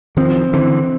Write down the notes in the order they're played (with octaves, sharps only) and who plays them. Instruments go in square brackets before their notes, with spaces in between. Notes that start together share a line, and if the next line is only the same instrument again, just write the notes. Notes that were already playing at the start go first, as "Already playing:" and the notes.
[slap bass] D#3 F3 [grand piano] C4
[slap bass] D3 E3 [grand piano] C4